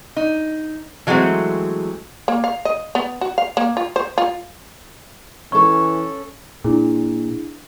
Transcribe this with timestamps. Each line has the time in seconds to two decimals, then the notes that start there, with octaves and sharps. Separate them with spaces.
0.16 D#4
1.07 E3 F#3 G#3 A3 C4
2.28 A#3
2.44 F5
2.65 D#5
2.95 B3
3.21 F#4
3.38 F5
3.57 A#3
3.77 F4
3.96 C5
4.18 F4
5.52 E3 C#4 A4 C#6
6.64 A#2 D4 E4 G#4